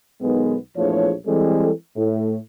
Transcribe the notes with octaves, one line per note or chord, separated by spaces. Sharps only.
B1 D#3 G#3 B3
A#1 E2 F3 A3 C#5
E3 G3 G#3 C4 A4
A2